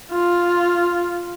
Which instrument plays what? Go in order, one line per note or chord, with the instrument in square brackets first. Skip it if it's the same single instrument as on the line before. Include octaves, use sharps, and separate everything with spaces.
[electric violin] F4